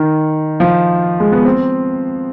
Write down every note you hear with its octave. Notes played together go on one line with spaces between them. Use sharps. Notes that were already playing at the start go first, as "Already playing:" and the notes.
Already playing: D#3
F3
G#3
B3
C4